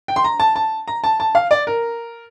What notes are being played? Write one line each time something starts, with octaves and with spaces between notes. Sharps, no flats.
G5
C6
A#5
A5
A5
A#5
A5
A5
F5
D5
A#4